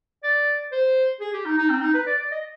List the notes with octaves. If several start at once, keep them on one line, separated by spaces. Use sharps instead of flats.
D5
C5
G#4
G4
D#4
D#4
C4
D#4
B4
D5
D5
D#5